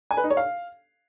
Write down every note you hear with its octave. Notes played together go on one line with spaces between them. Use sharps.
G#5
B4
D#4
C#5
F5